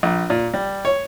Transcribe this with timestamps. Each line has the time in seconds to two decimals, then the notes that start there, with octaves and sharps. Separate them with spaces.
0.03 A#1
0.30 A#2
0.54 G3
0.85 C#5